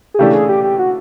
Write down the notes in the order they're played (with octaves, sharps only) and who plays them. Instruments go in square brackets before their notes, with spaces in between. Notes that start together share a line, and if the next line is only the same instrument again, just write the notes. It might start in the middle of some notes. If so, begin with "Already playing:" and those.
[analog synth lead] G#4
[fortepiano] C#3 E3 A3 D4 [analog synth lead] G4
[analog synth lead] G#4
G4
G4
F#4